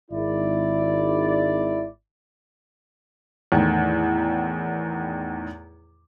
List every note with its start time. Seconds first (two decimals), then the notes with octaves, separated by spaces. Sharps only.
0.11 G#1 E4 D5
3.52 E2 A2 D#3